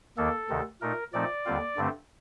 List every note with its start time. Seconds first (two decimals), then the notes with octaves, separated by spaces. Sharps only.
0.18 D#2 D#3 A#3 A4
0.49 D2 C3 D#3
0.81 A#2 A3 D#4 A#4
1.13 A#2 F3 A3 C4 D#4 D5
1.45 D#2 D3 G3 C4 F4
1.77 G2 D3 A3 C4